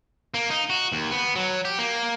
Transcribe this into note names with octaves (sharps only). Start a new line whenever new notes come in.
A#3
D#4
F#4
D#2
B3
F#3
G4
A#3